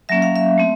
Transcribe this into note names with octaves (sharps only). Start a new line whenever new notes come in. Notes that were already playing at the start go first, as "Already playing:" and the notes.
F#3 A#3 C#4 E5
F5
E5
A3 C4